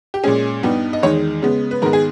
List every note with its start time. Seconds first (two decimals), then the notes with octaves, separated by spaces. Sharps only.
0.14 G4
0.24 A#2 G#3 C#4 G#4
0.63 G2 G3 B3 D#4
0.93 D#5
1.02 E2 D#3 G#3 D#4 C#5
1.42 C#3 G#3 B3
1.71 B4
1.82 G#2 D#3 G#3 B3 A#4
1.93 G#4